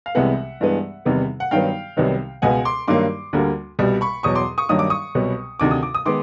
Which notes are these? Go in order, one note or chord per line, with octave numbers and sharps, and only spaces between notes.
F5
C2 C3 E3 G#3 B3 E5 F#5
G2 E3 G#3 B3
E2 C3 D#3 G3 B3
F#5
G2 D#3 F#3 B3 F5 G5
C2 C3 D#3 F#3 B3
C#2 B2 G#3 B3 F#5 G#5
C6 D6
G2 D#3 F#3 A#3 C6 D6
D2 D3 G3 A#3
C2 B2 G3
B5 C#6
E2 B2 F#3 C#6 D#6
C6 D6
C#6 D#6
G2 D#3 F#3 A#3 D#6
D6
C#6 D#6
C2 B2 F#3 B3
D2 C3 D#3 D6
D#6
D6
D#6
D#3 G#3 B3 C6 D6